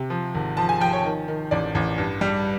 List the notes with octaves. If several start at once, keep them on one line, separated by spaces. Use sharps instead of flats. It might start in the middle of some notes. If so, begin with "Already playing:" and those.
Already playing: C3
F3
G#1
F3 A5
G#5
F3 G5
C#5
D#3
D#3
A1 D5
A1
G2
G3